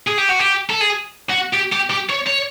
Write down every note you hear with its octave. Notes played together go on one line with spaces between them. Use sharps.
G#4
G4
F#4
G4
A4
G#4
F#4
G4
G4
G4
C#5
C#5